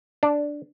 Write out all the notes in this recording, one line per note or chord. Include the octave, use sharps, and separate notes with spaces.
D4